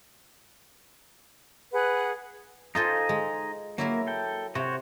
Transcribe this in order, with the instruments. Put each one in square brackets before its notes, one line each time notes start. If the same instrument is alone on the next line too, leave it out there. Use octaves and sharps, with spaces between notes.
[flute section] G#4 B4 F#5
[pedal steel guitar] D#4 D#5 G#5 [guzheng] F4 A4 C5
[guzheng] G#3
[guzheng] F#3 E4 A#4 [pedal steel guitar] A#3
[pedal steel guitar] A4 G5
[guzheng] C3 [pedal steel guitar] F#4 C5 C#5